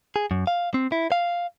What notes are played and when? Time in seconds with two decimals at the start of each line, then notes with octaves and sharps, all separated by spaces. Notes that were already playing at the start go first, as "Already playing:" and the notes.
0.16 G#4
0.31 F#2
0.47 F5
0.74 C4
0.92 E4
1.12 F5